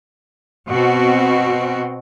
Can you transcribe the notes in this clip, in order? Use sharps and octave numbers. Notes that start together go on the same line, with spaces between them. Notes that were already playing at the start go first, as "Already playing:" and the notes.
B2 C4 F#4